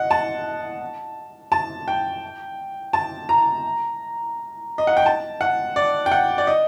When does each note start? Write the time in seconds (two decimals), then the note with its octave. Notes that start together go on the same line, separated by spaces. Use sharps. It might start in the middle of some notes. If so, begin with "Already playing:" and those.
Already playing: D#5 F#5
0.11 A5
1.52 A5
1.88 G5
2.93 A5
3.29 A#5
4.78 D#5
4.87 F#5
4.97 G5
5.06 A5
5.41 F#5
5.76 D5
6.06 G5
6.12 F#5
6.38 D5
6.47 D#5